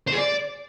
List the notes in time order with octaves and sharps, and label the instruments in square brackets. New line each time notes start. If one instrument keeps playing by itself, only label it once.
[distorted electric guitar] C5
G#4
D5